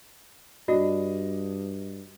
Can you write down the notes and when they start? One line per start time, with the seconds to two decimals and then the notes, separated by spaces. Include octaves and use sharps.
0.68 G2 D4 F#4 D#5